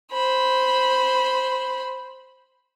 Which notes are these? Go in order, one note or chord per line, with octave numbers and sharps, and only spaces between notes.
C5 B5